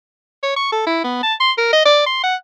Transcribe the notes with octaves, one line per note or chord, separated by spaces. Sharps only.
C#5
C#6
A4
E4
B3
A5
C6
A#4
D#5
D5
C6
F#5